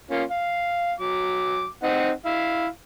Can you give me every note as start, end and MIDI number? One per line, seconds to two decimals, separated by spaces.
0.11 0.23 58
0.11 0.23 61
0.11 0.23 65
0.31 0.92 77
1.00 1.65 54
1.00 1.65 86
1.83 2.10 60
1.83 2.10 63
1.83 2.10 78
2.26 2.67 64
2.26 2.67 77